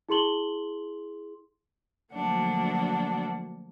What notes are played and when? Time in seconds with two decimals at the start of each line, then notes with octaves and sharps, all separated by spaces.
0.09 E4 G#4 C6 F#7 G7
2.13 D2 F3 F#3 A#3 D4 F#5